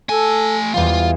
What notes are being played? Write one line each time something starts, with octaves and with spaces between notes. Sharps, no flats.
A3 A4 G#5
E2 G3 G#3 F4 F5